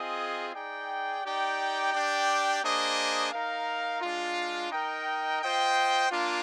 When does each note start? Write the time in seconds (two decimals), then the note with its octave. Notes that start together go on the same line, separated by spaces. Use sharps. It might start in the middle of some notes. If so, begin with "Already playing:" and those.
Already playing: C4 F4 G#4 D#5
0.54 D#4 G#4 D5 G5
1.24 D#4 G4 D5 G5
1.93 D4 G4 D5 G5
2.63 A#3 D4 G#4 C5 D#5
3.33 D#4 A#4 F5
4.01 G#3 D4 F4
4.71 D#4 A#4 D#5 G5
5.42 F4 C5 D#5 G5
6.11 A#3 D4 F4